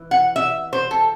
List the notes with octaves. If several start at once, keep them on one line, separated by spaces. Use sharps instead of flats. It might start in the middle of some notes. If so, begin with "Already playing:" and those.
Already playing: E3
F#5
E5
C5
A4